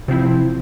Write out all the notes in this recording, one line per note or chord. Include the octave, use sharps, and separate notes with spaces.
C3 F3 C4 E4